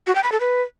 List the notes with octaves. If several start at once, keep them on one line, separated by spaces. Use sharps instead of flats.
F#4
G5
B5
A4
B4